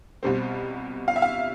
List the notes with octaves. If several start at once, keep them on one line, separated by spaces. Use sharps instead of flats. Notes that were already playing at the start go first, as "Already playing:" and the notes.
C2 B2 G3 C4
F5
E5
F5